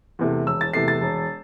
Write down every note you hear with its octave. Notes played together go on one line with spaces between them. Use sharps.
E2 C3 A3
E1 E6
A6
E2 C3 A3 C7
A6
E1